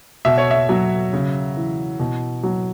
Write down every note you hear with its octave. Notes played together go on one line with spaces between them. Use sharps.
B2 E5
C#5
E5
F#3
C#3
E3
B2
F#3